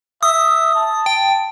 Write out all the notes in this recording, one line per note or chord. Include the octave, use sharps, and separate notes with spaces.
E5 D#6
A5
G5